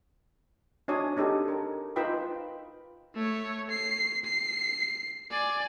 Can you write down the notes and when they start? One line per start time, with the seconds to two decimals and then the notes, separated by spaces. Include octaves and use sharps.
0.88 D4 D#4 F#4 C#5 G#5 D#6
1.17 D4 D#4 G4 A4
1.48 A#4
1.96 D#4 F4 B4 G5 B5 E6
3.14 A3 C#5
3.70 C7
4.24 C7
5.31 D5 G#5